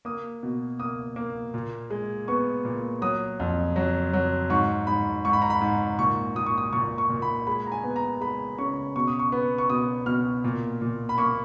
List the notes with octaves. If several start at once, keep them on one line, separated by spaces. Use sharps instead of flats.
A#3 D#6
B2
A#3 D#6
A#3
A#2
G#3
B3 C#6
A#2
F#3 D#6
F2
F#3
F#3
G#2 C#6
G#2 B5
G#2 C#6
B5
A#5
B5
G#2
A#2 C#6
A#2 D#6
C#6
D#6
A#2 C#6
C#6
A#2
B5
G#3 B5
A#5
G#5
B3
A#5
G#3 B5
C#3 C#6
B2 C#6
D#6
C#6
B3
C#6
B2 D#6
B2 F6
A#2
A#2
B5
A#3 C#6